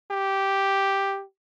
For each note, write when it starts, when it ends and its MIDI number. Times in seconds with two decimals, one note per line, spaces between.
0.11 1.22 67